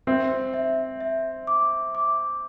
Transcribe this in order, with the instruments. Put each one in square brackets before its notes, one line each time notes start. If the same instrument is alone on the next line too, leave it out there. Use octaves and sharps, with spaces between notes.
[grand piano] C4 [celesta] E5
[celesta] E5
E5
D6
D6